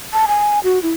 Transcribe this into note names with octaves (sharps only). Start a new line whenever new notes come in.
A5
G#5
F#4
E4